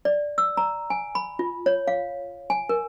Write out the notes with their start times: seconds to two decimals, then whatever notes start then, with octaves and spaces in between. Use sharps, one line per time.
0.05 D5
0.38 E6
0.57 A#5
0.90 G#5
1.15 B5
1.39 F4
1.66 C#5
1.87 F5
2.50 G#5
2.69 A#4